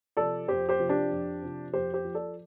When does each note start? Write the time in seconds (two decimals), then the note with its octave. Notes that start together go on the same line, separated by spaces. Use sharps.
0.17 C3 F3 A4 D5
0.48 F2 G4 C5
0.69 G4 C5
0.79 C3 F3
0.89 D4 G4
1.11 F2
1.42 C3 F3
1.73 F2 G4 C5
1.94 G4 C5
2.05 F3
2.15 A4 D5